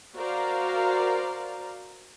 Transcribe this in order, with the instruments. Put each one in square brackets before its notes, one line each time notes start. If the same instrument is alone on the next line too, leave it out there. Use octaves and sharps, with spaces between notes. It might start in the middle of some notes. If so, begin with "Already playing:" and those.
[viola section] F#4 A#4 C5 D5 F5 A#5